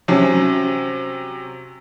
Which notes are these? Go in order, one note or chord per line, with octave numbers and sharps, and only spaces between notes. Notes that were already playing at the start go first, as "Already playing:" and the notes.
C3 F#3 C#4